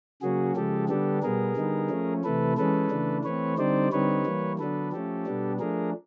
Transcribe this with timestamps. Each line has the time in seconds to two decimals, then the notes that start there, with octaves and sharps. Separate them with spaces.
0.22 C#3 F#3 A#3 C#4 F#4 G#4
0.56 C#3 F3 G#3 G4 A4
0.89 D3 G3 B3 D4 G4 A4
1.23 B2 G3 B3 G#4 A#4
1.56 D3 G3 B3 D#4
1.89 F3 A3 C#4
2.24 C3 E3 A3 A4 B4
2.57 E3 G#3 C#4 A4 B4
2.90 C#3 E3 A3 D4
3.24 E3 A3 C4 B4 C#5
3.58 D3 G3 C4 D#4 C5 D5
3.92 D3 G3 C4 D#4 B4 C#5
4.26 E3 G3 A#3
4.59 D3 F#3 B3 D4 A4 B4
4.92 F3 A3 C#4 G4 A4
5.26 B2 G3 B3 D4
5.60 F3 A3 D4 G#4 A#4